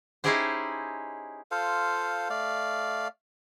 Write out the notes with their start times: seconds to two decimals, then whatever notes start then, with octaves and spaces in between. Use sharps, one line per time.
0.24 C#4 D#4 E4 G4 G#4 C5
1.51 F4 A4 C5 F5
2.30 A3 D5 F5